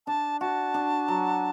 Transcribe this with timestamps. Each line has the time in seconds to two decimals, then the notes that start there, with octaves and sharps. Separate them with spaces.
0.07 D4 A5
0.41 F#4 A5
0.74 D4
1.08 F#3